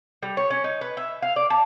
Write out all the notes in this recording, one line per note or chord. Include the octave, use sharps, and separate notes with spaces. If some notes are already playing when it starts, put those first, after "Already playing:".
G3
C#5
C#4
D#4
B4
E5
F5
D5
A5